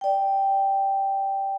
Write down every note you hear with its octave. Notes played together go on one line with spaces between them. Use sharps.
D5 G5